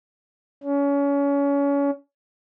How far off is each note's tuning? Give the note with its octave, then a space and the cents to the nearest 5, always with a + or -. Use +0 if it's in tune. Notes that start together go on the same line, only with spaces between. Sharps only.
C#4 +30